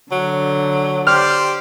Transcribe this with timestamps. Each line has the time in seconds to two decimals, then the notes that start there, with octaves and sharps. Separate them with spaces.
0.12 D3 F#3
1.07 G4 C5 D5 F6